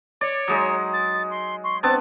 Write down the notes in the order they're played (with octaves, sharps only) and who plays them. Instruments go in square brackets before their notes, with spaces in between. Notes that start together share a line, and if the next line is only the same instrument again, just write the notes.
[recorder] C#5 [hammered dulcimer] D5
[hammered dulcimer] F#3 G#3 D#4 [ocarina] D#6
[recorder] A6
C6
[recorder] C6 [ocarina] C#6
[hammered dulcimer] B3 C4 D4 [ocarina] C5 [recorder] A6